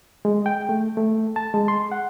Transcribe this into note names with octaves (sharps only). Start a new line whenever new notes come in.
G#3
G5
A3
A3
A5
G#3
C6
F#5